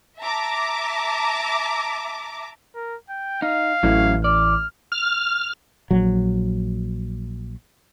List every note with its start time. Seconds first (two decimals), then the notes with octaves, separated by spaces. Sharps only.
0.20 E5 A5 A#5 D6
2.75 A#4
3.10 G5
3.42 D#4 F5
3.83 A1 F#3 C#4 E4
4.24 D5 F6
4.92 F6
5.91 A#1 F#3